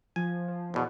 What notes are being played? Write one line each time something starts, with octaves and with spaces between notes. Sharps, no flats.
F3 G#5
F3
E2 B2